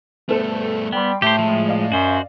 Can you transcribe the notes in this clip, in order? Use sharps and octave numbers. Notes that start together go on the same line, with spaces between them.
G2 A3 B3 A4 C5
G3 B3 G5 C6
A2 A3 G4 C5
F3 G#3
D5 D#5 F5
F#2 F#4 C5